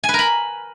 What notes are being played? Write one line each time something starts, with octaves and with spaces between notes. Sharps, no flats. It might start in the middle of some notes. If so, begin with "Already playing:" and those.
G#5
B4
A#4
B5